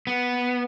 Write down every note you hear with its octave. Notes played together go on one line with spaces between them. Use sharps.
B3